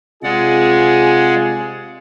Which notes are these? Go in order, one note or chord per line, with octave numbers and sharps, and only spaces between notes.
C3 G#3 F4 G#4 D5 F#5